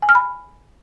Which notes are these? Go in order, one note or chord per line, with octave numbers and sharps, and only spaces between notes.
G#5
F6
B5